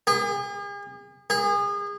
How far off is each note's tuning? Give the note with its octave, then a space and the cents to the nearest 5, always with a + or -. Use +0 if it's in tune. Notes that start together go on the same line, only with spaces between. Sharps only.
G#4 -45
G#4 -35